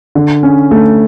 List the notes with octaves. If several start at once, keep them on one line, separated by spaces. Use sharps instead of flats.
D3
C#4
A3